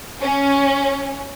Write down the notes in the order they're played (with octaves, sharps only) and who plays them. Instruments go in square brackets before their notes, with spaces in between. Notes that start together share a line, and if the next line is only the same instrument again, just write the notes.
[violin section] C#4